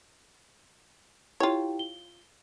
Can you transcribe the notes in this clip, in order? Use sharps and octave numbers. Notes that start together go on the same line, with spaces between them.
E4 F4 G4 C#5 G5
G7